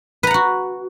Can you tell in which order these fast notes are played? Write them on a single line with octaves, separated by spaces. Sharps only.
B4 A#5 F#5 F#4